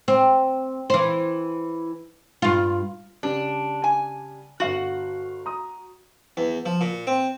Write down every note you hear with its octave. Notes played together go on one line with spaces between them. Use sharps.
C4
E3 C5
G2 F4
C#3 G3 D4
G#5
G1 F#4 F5 F#7
A#5 D#6
E2
F3
A#2
C4